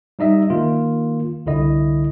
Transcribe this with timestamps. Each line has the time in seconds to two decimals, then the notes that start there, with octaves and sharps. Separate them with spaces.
0.19 G3 D#4 D#5 E5
0.50 D#3 A#3 F4
1.46 C2 D3 E4 D#5